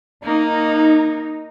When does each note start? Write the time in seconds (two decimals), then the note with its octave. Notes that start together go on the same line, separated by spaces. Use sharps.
0.23 A#3 D#4